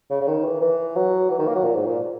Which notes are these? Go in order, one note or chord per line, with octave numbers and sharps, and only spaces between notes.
C#3
C#3
D#3
E3
E3
F#3
E3
D#3
A#3
F#3
A#2
G#2
A#2